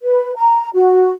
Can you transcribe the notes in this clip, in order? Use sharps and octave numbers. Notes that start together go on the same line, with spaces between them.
B4
A#5
F#4